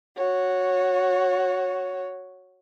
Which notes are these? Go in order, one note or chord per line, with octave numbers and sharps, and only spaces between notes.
F#4 C#5